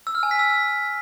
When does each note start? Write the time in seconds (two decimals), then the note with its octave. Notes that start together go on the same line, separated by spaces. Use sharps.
0.07 E6
0.15 F6
0.23 G#5
0.31 B6
0.39 E6